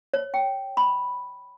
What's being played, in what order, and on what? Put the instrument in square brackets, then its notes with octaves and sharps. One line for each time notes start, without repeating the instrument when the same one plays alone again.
[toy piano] C#5
G5
B5